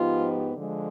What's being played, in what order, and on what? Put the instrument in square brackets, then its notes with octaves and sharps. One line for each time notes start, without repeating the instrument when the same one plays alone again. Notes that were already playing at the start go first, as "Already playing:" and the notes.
Already playing: [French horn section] G#2 F3 B3 D#4 G4 [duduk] F4
[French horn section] D3 F3 G#3